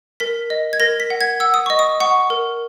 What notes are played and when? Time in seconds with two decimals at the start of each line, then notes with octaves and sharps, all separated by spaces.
0.20 A#4 B6
0.50 D#5
0.73 G#6
0.80 A#4 A#6
1.00 B6
1.10 F#5
1.21 G#6
1.40 F#5 E6
1.54 D#6
1.66 D#5 C#6
1.79 D#6
2.00 F#5 C#6
2.30 A#4